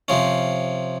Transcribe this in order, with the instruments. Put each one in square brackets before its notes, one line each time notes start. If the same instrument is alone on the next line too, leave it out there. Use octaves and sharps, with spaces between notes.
[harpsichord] C3 F3 C#4